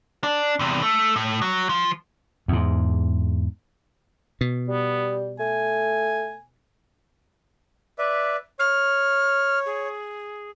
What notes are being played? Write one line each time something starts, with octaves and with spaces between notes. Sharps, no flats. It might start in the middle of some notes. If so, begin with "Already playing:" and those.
D4
E2 C3
A3
A2
F#3
F3
E2 G#2
B2
G3 B3
A3 G#5
B4 D5 E5
C#5 F6
G#4